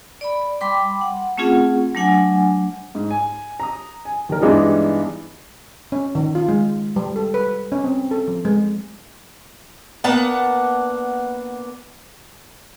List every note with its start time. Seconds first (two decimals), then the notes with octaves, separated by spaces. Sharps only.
0.21 D5 B5
0.61 G3 G5 B5 C6 D6
1.01 F#5
1.38 A3 C4 C#4 F4 G#4 F#5
1.95 F#3 A3 D4 F#5 G#5
2.95 G#2
3.10 G#5
3.60 A#5 D#6
4.05 G#5
4.29 D#2 A#4
4.41 G2 E3 G#3 B3 D4 D#4
5.92 C#4
6.15 D#3
6.35 F4
6.49 G#3
6.96 G3
7.16 A4
7.34 B4
7.72 C#4
7.84 C4
8.11 A4
8.28 F3
8.45 G#3
10.04 A#3 B3 D4 F#5 A5